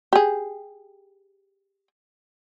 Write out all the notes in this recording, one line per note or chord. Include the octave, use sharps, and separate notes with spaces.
G4 G#4